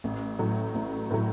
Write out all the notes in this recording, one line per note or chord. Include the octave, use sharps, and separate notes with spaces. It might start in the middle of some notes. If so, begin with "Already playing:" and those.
A1
A2 F#3
A1
A2 F#3